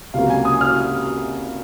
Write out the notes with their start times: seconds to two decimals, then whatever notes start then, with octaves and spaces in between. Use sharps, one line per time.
0.14 C#2 C3 F#3 A#3 F5
0.30 G#5
0.45 D#6
0.61 F6